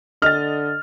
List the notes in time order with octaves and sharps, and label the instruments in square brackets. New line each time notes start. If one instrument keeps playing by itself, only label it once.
[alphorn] D3 [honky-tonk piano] D#5 A6 [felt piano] F6